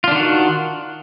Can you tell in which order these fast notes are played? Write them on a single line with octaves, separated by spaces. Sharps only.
F4 D4 D#3 F#4